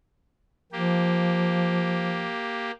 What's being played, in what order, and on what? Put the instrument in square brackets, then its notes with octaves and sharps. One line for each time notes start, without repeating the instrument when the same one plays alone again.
[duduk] F3 [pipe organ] A#3 G4